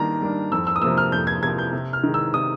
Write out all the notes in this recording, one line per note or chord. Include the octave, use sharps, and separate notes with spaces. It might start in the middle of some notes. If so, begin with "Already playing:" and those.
Already playing: D#3 G3 A#3 D4 A#5
G3 A#3 D4
F2 E6
E6
D#6
C3 F3 A#3 E6
F6
F2 G6
G#6
C3 F3 A#3 G#6
G6
C3
F6
D#3 G#3
E6
C3 D#6